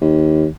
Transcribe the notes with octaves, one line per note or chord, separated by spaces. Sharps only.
D#2